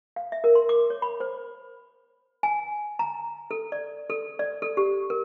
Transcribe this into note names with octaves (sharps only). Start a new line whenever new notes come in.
F5
E5
A#4
C6
D6
C#5
B5
C5
G#5
A#5
A4
D5
A4
D5
A4
G4
A#4